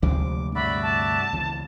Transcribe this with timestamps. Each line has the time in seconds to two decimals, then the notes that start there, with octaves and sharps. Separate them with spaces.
0.02 D2 C3 F3 G#3 D6
0.55 G2 C3 F#4 D5 E5 B5
0.83 A5
1.33 C#2 B2 E3